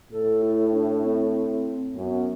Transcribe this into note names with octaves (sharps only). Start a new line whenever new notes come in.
A2 A4
E4
D4
C4
F#2 B3